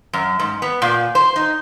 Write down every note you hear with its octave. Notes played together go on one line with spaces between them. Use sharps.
F#2
G#2
B3
A#2
C5
D#4